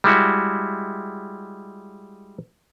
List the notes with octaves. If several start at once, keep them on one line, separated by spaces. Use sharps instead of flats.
G3 G#3 E4 F#4